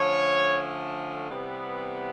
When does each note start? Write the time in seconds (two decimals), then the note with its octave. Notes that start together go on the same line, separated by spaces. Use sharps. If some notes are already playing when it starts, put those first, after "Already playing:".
Already playing: D3 F3 A3 C#4 C#5
1.29 C3 E3 G3 B3